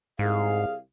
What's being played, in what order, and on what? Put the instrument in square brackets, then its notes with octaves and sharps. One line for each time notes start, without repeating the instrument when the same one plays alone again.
[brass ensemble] C2 F5 [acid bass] G#2 [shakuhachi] G#4